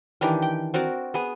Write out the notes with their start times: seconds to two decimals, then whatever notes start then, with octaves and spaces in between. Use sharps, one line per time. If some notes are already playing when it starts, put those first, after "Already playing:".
0.21 D#3 E3 D4 G4
0.42 G5
0.74 C4 F#4 A#4 D5
1.14 B3 G#4